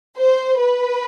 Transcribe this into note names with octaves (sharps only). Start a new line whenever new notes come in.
C5
B4